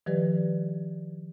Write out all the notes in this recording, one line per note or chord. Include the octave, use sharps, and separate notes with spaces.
D#3 F3 G3 G4 B4 D5